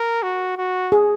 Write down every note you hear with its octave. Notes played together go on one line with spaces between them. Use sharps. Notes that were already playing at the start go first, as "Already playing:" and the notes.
Already playing: A#4
F#4
F#4
G#4